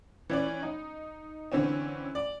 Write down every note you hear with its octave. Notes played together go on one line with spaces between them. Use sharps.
E3 C#4 D5
D#4
D3 E3 C4 C#4
D5